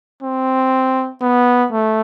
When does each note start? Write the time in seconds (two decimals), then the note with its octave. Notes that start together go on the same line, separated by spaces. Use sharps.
0.22 C4
1.21 B3
1.72 A3